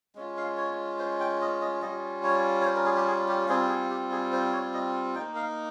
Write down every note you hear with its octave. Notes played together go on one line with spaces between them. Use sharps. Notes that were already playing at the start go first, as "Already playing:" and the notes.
G#3 C#4 F4
F5
C#5
C5
G5
D#5
D#5
G3 C#4 F4 D#5
C#5
C#5
C5
A#4
G#4
G4
G#4
G4
G3 C4 F4 G#4
G#4
G4
G#4
C5
C#5
D#5
A#3 D#4 G5
F5